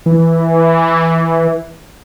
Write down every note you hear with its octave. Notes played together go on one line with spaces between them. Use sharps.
E3